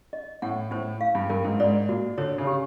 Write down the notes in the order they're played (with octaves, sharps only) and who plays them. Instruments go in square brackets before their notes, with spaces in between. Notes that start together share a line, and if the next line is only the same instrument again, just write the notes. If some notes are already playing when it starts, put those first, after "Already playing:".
[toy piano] D#5
[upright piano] A2 [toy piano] F#5
[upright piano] A2 [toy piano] C5
[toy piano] F5
[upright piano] G2
[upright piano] G2 [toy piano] A#4
[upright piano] G#2
[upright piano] G#2 [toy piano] D5
[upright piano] A#2 [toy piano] F#4
[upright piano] D3 [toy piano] C#5
[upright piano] C#3
[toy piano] G4